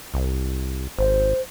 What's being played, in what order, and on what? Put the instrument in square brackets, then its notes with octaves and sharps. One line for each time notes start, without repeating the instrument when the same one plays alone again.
[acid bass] C2
[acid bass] G#1 [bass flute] C5